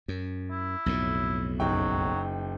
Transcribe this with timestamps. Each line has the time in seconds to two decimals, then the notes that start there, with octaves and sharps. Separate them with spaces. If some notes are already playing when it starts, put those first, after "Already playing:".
0.08 F#2
0.51 E4
0.86 B1 F2 A2
1.60 F#1 F#3 D#4 G5